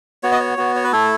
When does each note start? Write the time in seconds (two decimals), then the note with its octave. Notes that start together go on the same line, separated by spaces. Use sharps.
0.23 B3 F#4 C#5
0.32 D#5
0.40 C#5
0.58 B3 F#4
0.76 C#5
0.84 B4
0.92 A3 E4 A4